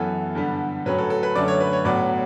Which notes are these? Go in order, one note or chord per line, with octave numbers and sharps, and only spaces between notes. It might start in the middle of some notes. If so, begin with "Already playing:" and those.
Already playing: F#2 E3 B3 A4
G2 D3 G3 B3
A2 F#3 C#4 B4
A4
A4
B4
F#2 D3 A3 C#4 D5
C#5
B4
C#5
A2 F#3 B3 D5